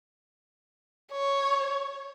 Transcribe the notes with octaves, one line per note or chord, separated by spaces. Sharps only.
C#5